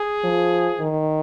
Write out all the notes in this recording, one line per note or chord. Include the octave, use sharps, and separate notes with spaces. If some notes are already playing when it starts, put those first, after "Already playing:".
Already playing: G#4
F3
D#3